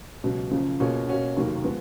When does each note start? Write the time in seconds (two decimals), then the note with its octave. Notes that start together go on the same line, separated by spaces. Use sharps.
0.24 C#2 B2 F#3
0.51 F#1 F#2 C#3 F3
0.80 B2 A#3 C#4 F4 G#4
1.07 B2 A#3 C#4 F#4
1.36 F1 D#2 D#3 F#3 A#3
1.64 F3 G#3 B3